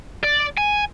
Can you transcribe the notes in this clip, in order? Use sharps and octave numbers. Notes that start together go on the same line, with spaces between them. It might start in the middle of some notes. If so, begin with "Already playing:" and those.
D5
G#5